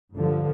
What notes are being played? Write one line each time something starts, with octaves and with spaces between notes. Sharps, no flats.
G2 D3 F3